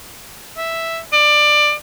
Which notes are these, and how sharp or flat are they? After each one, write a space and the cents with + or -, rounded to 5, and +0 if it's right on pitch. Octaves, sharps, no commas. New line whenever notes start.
E5 +0
D5 +20